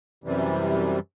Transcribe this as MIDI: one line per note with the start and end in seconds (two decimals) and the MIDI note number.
0.24 0.99 42
0.24 0.99 48
0.24 0.99 52
0.24 0.99 55